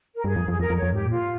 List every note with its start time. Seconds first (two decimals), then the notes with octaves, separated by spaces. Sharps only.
0.15 A#4
0.24 G2 G#4
0.36 F2
0.48 F2 G#4
0.59 F2 A#4
0.70 F2
0.76 C#5
0.82 F2
0.93 G#2 G4
1.05 A#2 F4